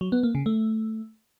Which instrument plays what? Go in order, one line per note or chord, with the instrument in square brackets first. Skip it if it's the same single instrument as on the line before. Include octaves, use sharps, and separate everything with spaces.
[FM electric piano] F#3
B3
A#3
C#3
A3